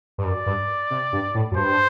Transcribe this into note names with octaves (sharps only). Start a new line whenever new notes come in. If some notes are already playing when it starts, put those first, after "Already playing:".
G2
F#2 D5
G2
C3
G2
A2
F#2
G2 C5